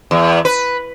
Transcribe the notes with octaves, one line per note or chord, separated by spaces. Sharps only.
E2
B4